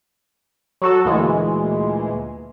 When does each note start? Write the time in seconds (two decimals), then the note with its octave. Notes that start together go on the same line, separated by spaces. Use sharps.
0.82 F#3 F#4 A4
1.05 D2 A#2 E3 G#3